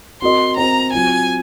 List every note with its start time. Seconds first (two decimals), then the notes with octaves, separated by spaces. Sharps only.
0.22 C4 F#4 A#4 D#5 C6
0.57 C4 F#4 A#4 D#5 A#5
0.93 F#3 C4 F4 G#5